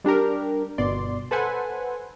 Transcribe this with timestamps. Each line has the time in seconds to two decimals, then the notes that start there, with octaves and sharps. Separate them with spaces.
0.04 G3 D4 G4 A#4
0.78 G1 B2 D5 C6
1.31 A4 B4 C5 F#5 G#5